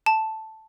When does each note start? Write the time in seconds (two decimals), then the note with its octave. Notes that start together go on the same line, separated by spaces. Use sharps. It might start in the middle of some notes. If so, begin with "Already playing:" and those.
0.06 A5